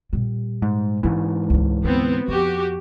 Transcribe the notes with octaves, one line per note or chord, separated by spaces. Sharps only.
A#2 G3
G#2
G#2 E3 G#3 C#4
C#2 C#3
D2 B3 C4
F2 F#4 G4